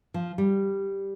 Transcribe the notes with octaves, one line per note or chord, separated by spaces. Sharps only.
F3
G3